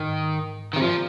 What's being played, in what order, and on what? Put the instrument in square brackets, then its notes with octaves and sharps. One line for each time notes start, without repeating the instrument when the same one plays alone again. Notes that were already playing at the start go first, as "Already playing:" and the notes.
Already playing: [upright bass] G#2 [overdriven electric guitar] D#3
[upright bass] C3 [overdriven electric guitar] D#3
[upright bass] A#2 [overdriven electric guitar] F3